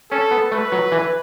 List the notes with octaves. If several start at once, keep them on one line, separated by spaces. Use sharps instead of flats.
C#4 A4
B3
A3 B4
F#3
E3